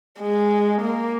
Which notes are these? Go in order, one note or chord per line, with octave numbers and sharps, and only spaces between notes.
G#3
A#3